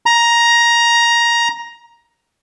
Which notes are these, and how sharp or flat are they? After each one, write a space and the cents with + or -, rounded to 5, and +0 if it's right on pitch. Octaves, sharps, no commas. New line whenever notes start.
A#5 +10